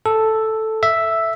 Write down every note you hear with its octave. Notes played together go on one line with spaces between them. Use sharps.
A4
E5